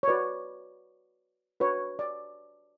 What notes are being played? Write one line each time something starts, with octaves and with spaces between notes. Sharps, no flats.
C#5
F#4 B4 D5
D4 F#4 B4 C#5
D5